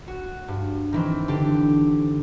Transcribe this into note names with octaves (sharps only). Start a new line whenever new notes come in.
F#4
G2
D#3 E3 C4
D3 G4